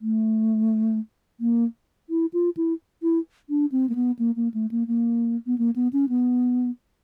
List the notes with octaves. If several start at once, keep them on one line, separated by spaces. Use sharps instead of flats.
A3
A#3
E4
F4
E4
E4
D4
C4
A#3
B3
A#3
A#3
A3
A#3
A#3
B3
A#3
B3
C#4
B3